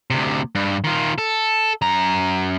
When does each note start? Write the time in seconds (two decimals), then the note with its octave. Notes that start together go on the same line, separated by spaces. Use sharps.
0.10 D2 C3
0.55 G2
0.84 D#3 F4
1.18 A4
1.82 F#2 A#5